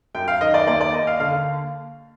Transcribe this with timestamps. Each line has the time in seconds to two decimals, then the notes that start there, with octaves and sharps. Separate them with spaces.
0.15 F#2 G5
0.28 F5
0.41 D#3 D#5
0.54 D5
0.67 D#2 D5
0.81 D5
0.94 D#2 D#5
1.07 F5
1.20 D3 F5